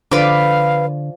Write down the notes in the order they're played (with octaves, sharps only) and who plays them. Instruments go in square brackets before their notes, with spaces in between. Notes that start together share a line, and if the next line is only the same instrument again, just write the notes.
[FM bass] D3 [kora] F3 D5 [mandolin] B4 D6 [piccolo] F5